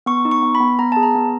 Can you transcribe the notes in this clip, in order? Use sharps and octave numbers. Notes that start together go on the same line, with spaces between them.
B3 C#6
D#4
C#6
B3
B5
B3
B3 A#5
G#4 A5
A#5
B3